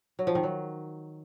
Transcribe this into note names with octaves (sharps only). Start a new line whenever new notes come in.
F#3
F3
D#3
F#3